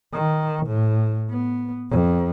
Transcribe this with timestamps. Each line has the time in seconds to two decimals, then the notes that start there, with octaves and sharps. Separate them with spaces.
0.13 D#3
0.67 A2
1.30 B3
1.91 F2